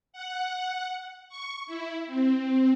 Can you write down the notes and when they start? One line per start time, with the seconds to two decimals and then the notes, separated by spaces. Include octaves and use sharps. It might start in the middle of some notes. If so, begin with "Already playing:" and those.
0.13 F#5
1.29 C#6
1.67 E4
2.06 C4